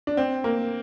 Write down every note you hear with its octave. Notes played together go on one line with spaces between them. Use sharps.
D4
C4
A#3